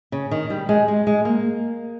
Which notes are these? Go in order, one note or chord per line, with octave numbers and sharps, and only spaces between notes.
C#3
D#3
G3
G#3
G#3
G#3
A#3